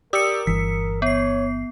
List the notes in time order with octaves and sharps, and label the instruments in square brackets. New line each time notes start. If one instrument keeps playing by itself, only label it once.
[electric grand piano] G4 D5 E6 [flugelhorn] A#4 [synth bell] D#6 C#7
[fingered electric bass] G1 E3 [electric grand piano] B6
[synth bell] B3 C7 [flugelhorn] C#5